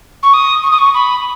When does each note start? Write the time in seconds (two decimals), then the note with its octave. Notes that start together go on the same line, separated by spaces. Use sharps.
0.23 C#6
0.34 D#6
0.63 C#6
0.71 D#6
0.79 C#6
0.94 B5